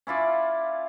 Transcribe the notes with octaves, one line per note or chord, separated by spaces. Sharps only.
C#4 E4 F4 D5